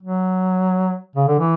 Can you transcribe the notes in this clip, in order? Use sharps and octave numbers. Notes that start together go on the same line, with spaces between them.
F#3
C#3
D3
E3